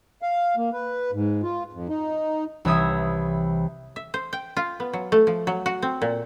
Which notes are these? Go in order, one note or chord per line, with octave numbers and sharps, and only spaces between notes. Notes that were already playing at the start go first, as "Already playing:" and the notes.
F5
A#3
B4
G#2
F4
F2
D#4
C2 E3 C#5 E5 D#6 G#6
E5
C5
G5
F4
B3
F#3
A3
F3
F#3
F#4
C4
A#2